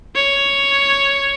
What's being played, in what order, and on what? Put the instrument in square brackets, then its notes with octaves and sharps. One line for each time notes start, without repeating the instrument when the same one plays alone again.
[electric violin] C#5